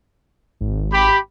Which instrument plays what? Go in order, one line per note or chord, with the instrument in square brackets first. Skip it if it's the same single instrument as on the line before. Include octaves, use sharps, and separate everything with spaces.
[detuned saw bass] G#1
[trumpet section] G4 B5